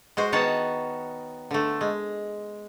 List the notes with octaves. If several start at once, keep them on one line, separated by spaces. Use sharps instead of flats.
G#3 F#4 C5
D#3 B3 C#5 F#5 A5
D3 A3
G#3